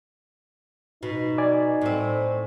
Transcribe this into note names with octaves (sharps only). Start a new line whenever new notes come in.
B2 D#4
D5 G#5
A2 C4